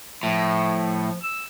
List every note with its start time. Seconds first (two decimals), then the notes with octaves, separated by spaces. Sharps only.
0.23 A2 F3
1.21 E6